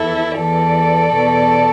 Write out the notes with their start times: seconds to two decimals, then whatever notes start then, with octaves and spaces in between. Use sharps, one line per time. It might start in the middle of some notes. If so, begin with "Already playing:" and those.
Already playing: E2 E3 E4 A4
0.38 E2 E3 A4 D5
1.15 E2 B2